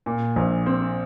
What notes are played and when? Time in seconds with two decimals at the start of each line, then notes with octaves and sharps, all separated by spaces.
0.06 A#2
0.36 A#1
0.66 C4